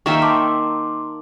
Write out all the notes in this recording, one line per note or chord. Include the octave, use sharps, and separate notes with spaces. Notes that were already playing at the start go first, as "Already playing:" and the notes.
D#3 A#3 E5 G5 C#6
A5 C6 D6